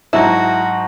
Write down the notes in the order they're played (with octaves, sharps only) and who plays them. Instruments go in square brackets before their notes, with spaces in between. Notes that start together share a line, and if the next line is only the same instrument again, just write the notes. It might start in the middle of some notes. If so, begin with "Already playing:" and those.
[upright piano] G#2 F#3 D#4 [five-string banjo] E4 [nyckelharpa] F#4 [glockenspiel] A5 C#6 A#6